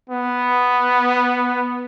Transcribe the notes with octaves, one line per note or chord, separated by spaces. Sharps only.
B3